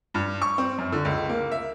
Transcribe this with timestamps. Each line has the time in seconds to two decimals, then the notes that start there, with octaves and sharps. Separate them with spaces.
0.14 G2
0.42 C#6
0.58 C4
0.78 F#2
0.92 D3
1.05 C#2
1.29 A#3
1.51 E5